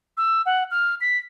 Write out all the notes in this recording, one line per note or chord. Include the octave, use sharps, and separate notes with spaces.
E6
F#5
F6
B6